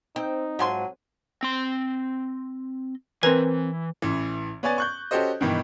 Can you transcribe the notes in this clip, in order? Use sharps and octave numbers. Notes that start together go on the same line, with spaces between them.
C4 D#4 G5
G#2 F3 F#3 G#5 C6
C4 C6
E3 C4 A#4 B4 G#5
A1 E3
B3 C#5 D5 G#5 A6
C#6 F#6 G6
C#4 F#4 G4 A4 C5 D#5
G2 B2 D#3 E3